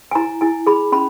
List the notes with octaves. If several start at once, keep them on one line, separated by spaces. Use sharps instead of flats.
G#5
E4 A#5
E4 G#5
G#4 B5
C#4 B5